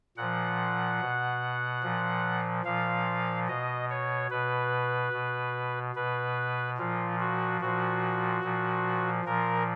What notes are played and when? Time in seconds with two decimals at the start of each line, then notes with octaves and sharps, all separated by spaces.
0.17 A#2 F3 F#5
1.01 B2
1.83 A#2 F3
2.65 A#2 F3 F5
3.48 B2 D#5
3.90 C#5
4.30 B2 B4
5.13 B2
5.95 B2 B4
6.78 A#2 F3 F4
7.19 F#4
7.61 A#2 F3 F#4
8.43 A#2 F3
9.25 A#2 F3 A#4